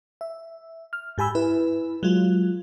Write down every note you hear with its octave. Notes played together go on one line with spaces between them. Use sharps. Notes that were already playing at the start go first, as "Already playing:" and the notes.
E5
F6
G#2 G4 G#5 B5 E6
E4 B4
F#3 G#3 F4